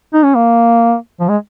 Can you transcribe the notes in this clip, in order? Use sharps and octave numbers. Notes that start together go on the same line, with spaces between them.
D#4
C#4
A#3
F3
G#3